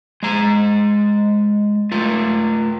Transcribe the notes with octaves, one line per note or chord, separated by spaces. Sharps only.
G#3 A#5
A3 F4